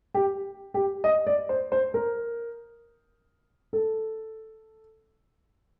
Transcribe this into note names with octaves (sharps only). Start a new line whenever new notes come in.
G4
G4
D#5
D5
C5
C5
A#4
A4